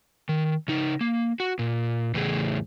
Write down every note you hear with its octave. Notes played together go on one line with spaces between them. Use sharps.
D#3
C#3 D#4
A#3
F#4
A#2
E2 A2 C#3 G#4